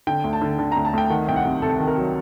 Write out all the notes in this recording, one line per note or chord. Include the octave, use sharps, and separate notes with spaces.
D3 G5
D2
A5
D3
D3
D2 A#5
A5
D2 G5
D#3 F#5
C2 G5
F#5
C3
C3 A4
D#3
A#4
F#3